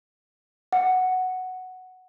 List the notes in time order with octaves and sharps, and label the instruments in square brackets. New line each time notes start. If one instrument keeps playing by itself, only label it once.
[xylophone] F#5